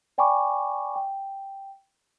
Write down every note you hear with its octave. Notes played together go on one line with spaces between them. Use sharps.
D5 G5 G#5 B5 C#6 D6
G5